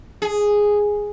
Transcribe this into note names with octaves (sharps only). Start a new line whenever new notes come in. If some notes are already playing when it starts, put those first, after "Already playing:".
G#4